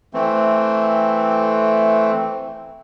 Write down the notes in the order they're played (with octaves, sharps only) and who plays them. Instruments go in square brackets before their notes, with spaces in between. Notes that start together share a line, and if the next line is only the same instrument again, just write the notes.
[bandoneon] E3 A3 C4